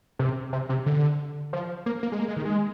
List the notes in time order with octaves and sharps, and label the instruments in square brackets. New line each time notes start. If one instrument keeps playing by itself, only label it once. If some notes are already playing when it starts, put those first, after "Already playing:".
[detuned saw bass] C3
C3
C3
D3
F3
A#3
A#3
G#3
A#3
G#3
D#3
G#3